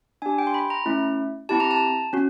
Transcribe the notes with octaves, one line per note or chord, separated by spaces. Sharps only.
D4 G4 G#5
G5
C6
B5
A#5
A3 C#4 E4
C4 E4 G4 A5
A#5
A5
C#4 F#4